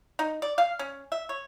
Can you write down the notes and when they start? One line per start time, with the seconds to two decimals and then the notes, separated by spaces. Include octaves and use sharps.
0.19 D#4
0.42 D5
0.58 F5
0.79 C#4
1.12 E5
1.29 C#5